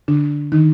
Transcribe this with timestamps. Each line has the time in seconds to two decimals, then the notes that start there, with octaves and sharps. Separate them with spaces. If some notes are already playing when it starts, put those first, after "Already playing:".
0.08 D3 D4
0.52 D#3 D#4